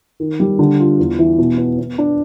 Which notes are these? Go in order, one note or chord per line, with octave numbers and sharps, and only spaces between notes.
D#3
G3
D3
F4
E2
E3
B2
B3
B3
D4